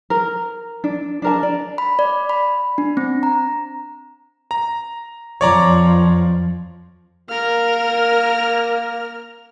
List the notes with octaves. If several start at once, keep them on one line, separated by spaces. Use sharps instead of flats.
A#4
D4
D4 A#4 A5
D5
B5
D5
B5
D4
C4
A#5
A#5
F2 F3 C#5 D5 A#5
A#3 A#4 F6